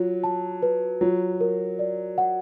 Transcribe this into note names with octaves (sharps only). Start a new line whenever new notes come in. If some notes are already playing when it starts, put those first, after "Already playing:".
Already playing: F#3 F4
A5
B4
F#3 F4
A#4
D5
F#5